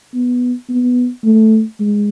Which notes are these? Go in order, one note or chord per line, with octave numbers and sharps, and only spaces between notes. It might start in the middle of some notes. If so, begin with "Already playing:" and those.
B3
B3
A3
G#3